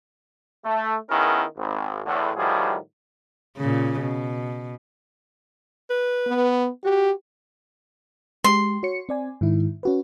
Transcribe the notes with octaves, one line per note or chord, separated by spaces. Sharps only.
A3
D#3 B3 C#4 E4 G#4 A#4
G#1
E2 A2 D3
A2 D#3 F3 G3 F#4 G#4
A#2 C#3
B2
B4
B3
F#4 G4
G#3 G4 C6
F#4 C#5 C#7
C4 D5 G#5
G#2 D#3 E4
C#4 F#4 B4